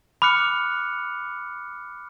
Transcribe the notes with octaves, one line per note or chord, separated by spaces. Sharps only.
B5 D6 F6 F#6 C#7